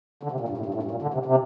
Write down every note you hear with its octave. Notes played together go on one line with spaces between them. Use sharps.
D3
C3
A#2
G2
A2
G2
A2
G2
A#2
D3
C3
C3